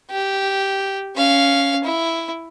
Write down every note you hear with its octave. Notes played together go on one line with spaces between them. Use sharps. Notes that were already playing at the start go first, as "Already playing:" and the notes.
G4
C#4 F5
E4